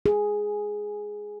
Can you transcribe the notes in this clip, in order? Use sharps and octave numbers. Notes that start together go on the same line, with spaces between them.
G#4